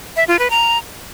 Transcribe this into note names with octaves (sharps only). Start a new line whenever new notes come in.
E5
F4
B4
A#5